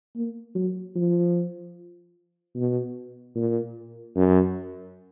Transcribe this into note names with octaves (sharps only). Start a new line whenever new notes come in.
A#3
F#3
F3
B2
A#2
F#2